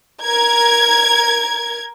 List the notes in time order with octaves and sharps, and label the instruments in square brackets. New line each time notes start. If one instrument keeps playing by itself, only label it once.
[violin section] A#4 G#6